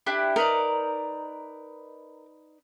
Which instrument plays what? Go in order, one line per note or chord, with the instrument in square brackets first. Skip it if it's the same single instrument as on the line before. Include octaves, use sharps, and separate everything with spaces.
[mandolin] D4 E4 G4
[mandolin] D#4 B4 D5 [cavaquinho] A#4